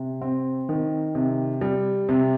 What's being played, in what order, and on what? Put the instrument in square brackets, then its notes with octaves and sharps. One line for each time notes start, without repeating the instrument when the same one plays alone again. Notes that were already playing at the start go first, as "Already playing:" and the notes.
Already playing: [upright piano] C3
C4
D#3
C3
G3
C3